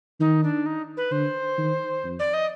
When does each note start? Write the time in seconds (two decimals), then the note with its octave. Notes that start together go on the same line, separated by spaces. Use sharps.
0.20 D#3 D#4
0.44 D4
0.66 D#4
0.97 B4
1.11 D3 C5
1.58 D#3
2.04 F2
2.19 D5
2.34 D#5